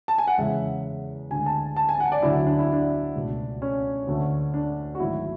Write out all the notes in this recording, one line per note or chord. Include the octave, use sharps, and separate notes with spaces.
A5
G#5
F#5
E2 C#3 G#3 E5
D2 D3 G#3 G#5
A5
A5
G#5
F#5
D5
D2 D3 F#3 E4
D4
E4
D4
C#2 B2 A3
C#4
D2 D3 A3
D4
F#4
G#1 G#2 F#3 A3 E4